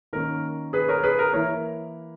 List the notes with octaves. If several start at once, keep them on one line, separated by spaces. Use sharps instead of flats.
D#3 A#3 C#4 A#4
G#4 B4
A#4 C#5
G#4 B4
A#4
E3 A#3 E4 A#4 C#5